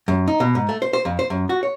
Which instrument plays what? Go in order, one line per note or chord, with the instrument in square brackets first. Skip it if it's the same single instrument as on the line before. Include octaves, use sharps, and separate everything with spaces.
[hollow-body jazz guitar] F#2
D#4
B2
G#2
A3
C5
C5
F2
C5
F#2
F#4
C#5